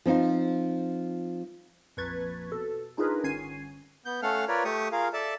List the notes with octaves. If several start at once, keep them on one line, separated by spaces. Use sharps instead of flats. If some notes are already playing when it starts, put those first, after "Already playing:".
F3 C4 D#4 F4
A#1 F2 B4 C#6 G#6 A6
B2 A4
D4 D#4 F4 G#4 A#4 B4
G1 C#4 G#6 C7 D#7
B3 G6
A3 C#4 A4 F5 F#5 F6
F4 A#4 B4 C#5 D5
A3 G4 C#6 D#6
F4 G#4 A#4 F5
A4 D5 E5 A5